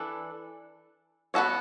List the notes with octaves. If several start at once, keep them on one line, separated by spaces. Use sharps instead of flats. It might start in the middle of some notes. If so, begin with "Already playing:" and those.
Already playing: E3 D4 A4
B3 F#4 A4 C#5